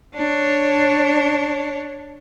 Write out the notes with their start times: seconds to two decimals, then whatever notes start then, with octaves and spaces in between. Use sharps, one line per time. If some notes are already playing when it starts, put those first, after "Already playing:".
0.15 D4 C#5